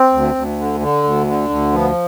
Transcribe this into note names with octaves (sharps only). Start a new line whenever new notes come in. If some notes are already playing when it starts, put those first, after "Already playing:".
Already playing: C4
D2
D2
D3
D3
D2
D3
D2
F3 B3